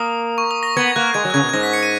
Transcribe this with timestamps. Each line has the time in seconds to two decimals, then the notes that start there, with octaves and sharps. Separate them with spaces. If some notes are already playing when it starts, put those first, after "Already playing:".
Already playing: A#3 D#6
0.38 C#6
0.51 D#6
0.63 A#6
0.76 B3 G#6
0.96 A#3 F#6
1.14 G#3 G#6
1.25 F#3
1.30 F#6
1.34 C#3 G#6
1.43 B2
1.49 G#6
1.53 G#2 A#6
1.63 B6
1.73 C#7
1.83 D#7